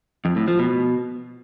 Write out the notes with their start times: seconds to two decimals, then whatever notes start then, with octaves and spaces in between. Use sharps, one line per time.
0.25 F2
0.36 A2
0.48 F3
0.59 B2